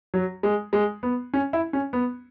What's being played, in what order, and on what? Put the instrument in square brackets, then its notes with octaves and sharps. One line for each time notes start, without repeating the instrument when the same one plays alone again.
[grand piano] F#3
G#3
G#3
B3
C#4
E4
C#4
B3